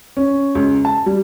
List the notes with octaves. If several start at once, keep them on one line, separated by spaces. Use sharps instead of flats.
C#4
C#2
A5
G3